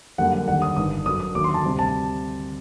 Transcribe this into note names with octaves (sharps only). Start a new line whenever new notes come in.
F#2 D3 G3 A#3 F#5
F#5
D#2 D3 G3 F#5
D#6
G1 G2 D#3 D#6
F#2 D3 F#3 D#6
D#6
D#2 D3 F#3 A3 D6
C6
A5
D2 C3 G3
A5